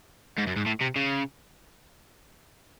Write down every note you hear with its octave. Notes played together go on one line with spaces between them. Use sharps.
G#2
F#2
G#2
A2
C3
C#3